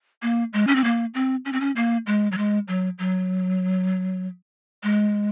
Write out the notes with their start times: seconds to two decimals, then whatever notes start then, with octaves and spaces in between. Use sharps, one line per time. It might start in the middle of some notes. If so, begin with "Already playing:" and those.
0.22 A#3
0.53 G#3
0.67 C#4
0.76 C4
0.84 A#3
1.14 C4
1.45 C#4
1.53 C4
1.60 C#4
1.76 A#3
2.07 G#3
2.32 F#3
2.38 G#3
2.68 F#3
2.99 F#3
4.83 G#3